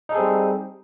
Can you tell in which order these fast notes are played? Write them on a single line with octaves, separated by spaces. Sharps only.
D#4 A4 G#4 C4 G3